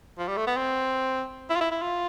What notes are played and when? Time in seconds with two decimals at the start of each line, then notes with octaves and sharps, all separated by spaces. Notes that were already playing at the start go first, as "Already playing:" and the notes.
0.18 F3
0.28 G3
0.37 A3
0.47 B3
0.57 C4
1.50 E4
1.56 F4
1.60 E4
1.71 E4
1.82 F4